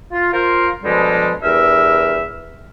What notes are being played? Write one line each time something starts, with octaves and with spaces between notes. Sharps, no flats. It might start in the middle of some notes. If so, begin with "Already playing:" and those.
F4
F4 A#4 C5
B2 D3 F3 G3 G#3
E2 G2 A#4 E5 E6 F6